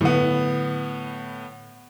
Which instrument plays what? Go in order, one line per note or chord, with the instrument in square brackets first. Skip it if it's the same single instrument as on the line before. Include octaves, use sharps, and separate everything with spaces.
[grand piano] A2 B3 [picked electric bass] D3 F#3